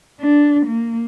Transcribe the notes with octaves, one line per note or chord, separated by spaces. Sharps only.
D4
A#3